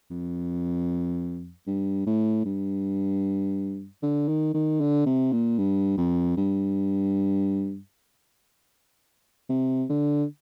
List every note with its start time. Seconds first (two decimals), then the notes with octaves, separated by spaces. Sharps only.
0.10 F2
1.67 G2
2.06 A2
2.45 G2
4.03 D3
4.28 D#3
4.54 D#3
4.81 D3
5.06 C3
5.32 A#2
5.59 G2
5.98 F2
6.37 G2
9.49 C3
9.89 D3